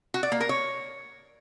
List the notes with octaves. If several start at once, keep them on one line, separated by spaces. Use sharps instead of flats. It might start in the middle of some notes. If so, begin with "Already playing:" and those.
F#4
D5
A#3
A#4
C#5